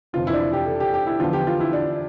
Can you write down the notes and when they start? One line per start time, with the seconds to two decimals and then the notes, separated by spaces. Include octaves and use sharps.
0.13 F1 F2 E3 F4
0.27 E4
0.33 D4
0.40 E4
0.53 G4
0.66 A4
0.80 G4
0.94 G4
1.07 E4
1.20 E2 D3 F3 F4
1.33 G4
1.47 F4
1.60 E4
1.73 D4